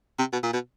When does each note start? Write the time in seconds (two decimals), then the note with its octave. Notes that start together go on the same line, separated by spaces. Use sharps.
0.19 C3
0.33 B2
0.43 A#2
0.53 B2